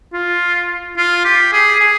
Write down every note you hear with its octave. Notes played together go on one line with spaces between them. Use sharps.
F4
F4
G4
G#4
G#4